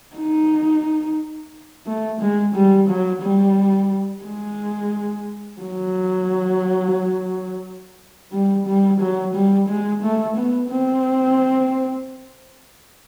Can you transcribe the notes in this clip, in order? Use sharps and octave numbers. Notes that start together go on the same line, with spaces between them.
D#4
A3
G#3
G3
F#3
G3
G#3
F#3
G3
G3
F#3
G3
G#3
A3
B3
C4